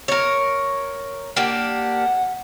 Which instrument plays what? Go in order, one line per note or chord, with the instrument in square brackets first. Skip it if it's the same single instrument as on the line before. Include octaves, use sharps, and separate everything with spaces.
[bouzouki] A#4 C#5
[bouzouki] A#3 D4 G4 [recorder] F#5